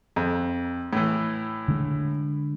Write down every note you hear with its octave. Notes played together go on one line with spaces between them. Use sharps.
F2
A2 E3
D3 G#3